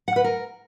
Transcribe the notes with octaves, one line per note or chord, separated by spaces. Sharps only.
F#5
B4
A#4